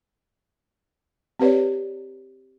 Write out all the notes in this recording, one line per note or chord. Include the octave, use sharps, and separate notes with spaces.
C4 G4 B4 C#5 D5